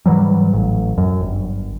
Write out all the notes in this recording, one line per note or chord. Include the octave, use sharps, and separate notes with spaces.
G#2 E3 F#3 G3
A1
F#2
G1